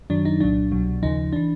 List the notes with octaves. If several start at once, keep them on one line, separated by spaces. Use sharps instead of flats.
F#2 D#3 F#3 D4
D#4
C2 A#2 F#3 D4
C2 B2 F#3
D#2 C#3 F3 D#4
E3 D4